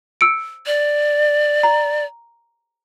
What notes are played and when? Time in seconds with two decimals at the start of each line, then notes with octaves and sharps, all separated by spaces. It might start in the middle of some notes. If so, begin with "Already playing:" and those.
0.21 E6 C#7 D7
0.66 D5
1.63 A#5